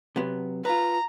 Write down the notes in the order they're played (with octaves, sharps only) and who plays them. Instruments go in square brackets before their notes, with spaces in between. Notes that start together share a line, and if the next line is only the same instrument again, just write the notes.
[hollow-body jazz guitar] C3 F#3 B3
[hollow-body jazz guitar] F4 B4 [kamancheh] A#5